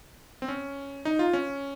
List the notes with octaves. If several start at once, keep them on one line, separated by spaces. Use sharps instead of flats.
C4
C#4
D#4
F4
C#4